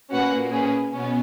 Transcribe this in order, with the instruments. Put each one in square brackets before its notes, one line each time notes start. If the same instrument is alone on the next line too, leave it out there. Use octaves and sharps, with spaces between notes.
[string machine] A#2 A#3 [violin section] C#4 F#4 B4 F#5
[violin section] C#4 G#4 B4
[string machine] B2 B3 [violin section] C#4